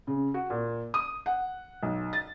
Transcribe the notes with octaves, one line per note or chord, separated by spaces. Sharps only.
C#3
F#4
A#2
D#6
F#5
B1
A6